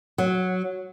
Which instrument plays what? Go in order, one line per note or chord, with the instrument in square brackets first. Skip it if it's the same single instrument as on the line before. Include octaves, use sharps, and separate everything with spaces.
[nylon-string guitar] F#3